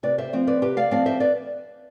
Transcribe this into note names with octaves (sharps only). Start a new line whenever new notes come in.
C3 B4 D5
C5 E5
F3 C4
B4 D5
C3 G4 B4
D5 F5
F3 C4 D5 F5
C5 E5
B4 D5